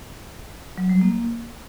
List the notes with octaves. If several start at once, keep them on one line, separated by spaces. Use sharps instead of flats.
F#3
G3
A#3